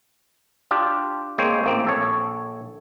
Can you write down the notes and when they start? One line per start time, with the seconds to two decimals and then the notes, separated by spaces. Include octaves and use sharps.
0.71 D4 F4 G4
1.38 G#3 A#3 C4 C5 C#5
1.64 A1 A#3 C4
1.85 A#1 A4 C#5